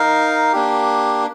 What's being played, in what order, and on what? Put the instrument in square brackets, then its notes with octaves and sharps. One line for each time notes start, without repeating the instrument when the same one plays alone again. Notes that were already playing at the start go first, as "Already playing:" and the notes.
Already playing: [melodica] D#4 A#4 F5
A#3 D4 G4